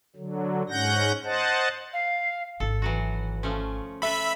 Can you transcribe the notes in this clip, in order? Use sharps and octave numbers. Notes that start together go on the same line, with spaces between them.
D3 F#3
G#2 C#4 F#5 G6 A#6
C5 D#5 F#5 A5
F5
G#1 A4
E3 F#3 F#4
F3 A3 C#4
A4 B4 E5 B5